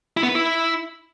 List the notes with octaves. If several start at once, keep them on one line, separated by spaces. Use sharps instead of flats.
E4
B3
B4
E4